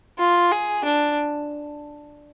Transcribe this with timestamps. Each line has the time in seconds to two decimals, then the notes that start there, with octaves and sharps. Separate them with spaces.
0.18 F4
0.51 G#4
0.84 D4